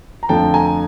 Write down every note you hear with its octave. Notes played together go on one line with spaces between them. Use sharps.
A#5
F2 D3 F3 A3 G5 A5
G#5 A#5